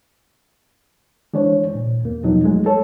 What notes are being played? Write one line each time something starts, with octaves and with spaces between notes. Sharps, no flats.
E3 G#3 D4 C5 C#5
A#2
E2 A#3
E2 B2 F3 F#3 D#4
F#3 G#3 A3
A4 C#5